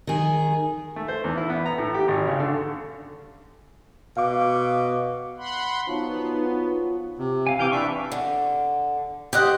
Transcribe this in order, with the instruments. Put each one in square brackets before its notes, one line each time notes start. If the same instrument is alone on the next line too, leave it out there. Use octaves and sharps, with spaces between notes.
[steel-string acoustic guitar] D#3 G#4
[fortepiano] A3
C5
E2
E4
B3
A#5
A2
G4
G#1
C#3
D3
[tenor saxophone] B2 [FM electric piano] F5 D6
[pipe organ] F#5 B5 C6
[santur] F3 F#3 [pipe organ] B3 [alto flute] D#4
[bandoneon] C3
[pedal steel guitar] F5 G#5
[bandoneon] C3 E3 G6 [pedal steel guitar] F5 G5 D6
[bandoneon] D4 E5 [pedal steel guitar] B4 D5 C#6
[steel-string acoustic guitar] D3
[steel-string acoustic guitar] G4 C5 D#5 [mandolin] F#5 F#6 G6